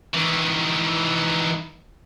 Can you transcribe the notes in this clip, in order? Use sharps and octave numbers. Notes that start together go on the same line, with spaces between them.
D#3 E3